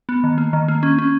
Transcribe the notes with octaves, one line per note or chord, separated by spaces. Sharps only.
B3
D#3
A#3
D#3
A#3
C#4
C#4